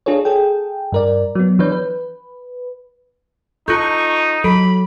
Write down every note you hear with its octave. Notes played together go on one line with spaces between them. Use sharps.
D4 F4 G#4 A4 C#5
G#4 A4 G5
G2 A#4 D5
F#3 B3
E3 F3 D4 B4 C#5 G6
B4
D#4 F4 A4 C#6 G6
F#3 A4 B5